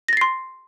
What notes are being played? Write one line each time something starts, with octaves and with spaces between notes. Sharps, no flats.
C6 A6 A#6 C7